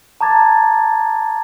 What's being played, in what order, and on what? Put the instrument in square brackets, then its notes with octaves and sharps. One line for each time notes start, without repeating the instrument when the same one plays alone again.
[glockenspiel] A5 A#5 D6 G#6 A6